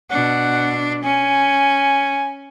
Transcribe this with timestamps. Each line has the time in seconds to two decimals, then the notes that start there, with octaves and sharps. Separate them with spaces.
0.11 B2 D4 F#5
1.04 C#4 G#5